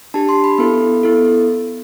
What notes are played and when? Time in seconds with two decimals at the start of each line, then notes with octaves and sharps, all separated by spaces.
0.14 D4 G4 A5
0.29 C6
0.44 B5
0.58 B3 E4 A4
1.03 B3 E4 A4